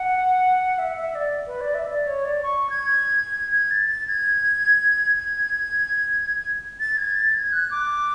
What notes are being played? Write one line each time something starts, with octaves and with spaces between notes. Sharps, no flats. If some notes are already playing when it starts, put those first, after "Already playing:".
Already playing: F#5
E5
E5
D5
B4
D5
E5
D5
C#5
D5
C#6
G#6
G#6
A6
A6
G#6
G#6
A6
G#6
A6
G#6
F#6
D6